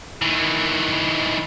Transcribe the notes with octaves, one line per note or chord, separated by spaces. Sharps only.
D#3 E3